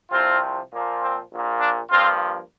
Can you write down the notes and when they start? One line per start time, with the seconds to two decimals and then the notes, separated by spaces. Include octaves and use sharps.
0.11 C2 C3 F3 C4 F4
0.71 A#2 F3 A#3
1.00 C4
1.30 A#1 A#2 A#3
1.60 D4
1.90 G2 F3 A#3 C4 F4